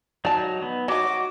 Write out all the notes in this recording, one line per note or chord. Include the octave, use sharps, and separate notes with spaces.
F#3 D#4 D5 A5
B3
F#3 D#4 F#4 D6